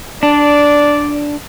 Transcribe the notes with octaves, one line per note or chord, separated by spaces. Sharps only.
D4 D5